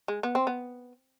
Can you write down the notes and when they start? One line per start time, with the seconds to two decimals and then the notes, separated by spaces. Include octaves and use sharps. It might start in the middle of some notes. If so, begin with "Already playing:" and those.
0.08 G#3
0.23 B3
0.35 C4
0.47 B3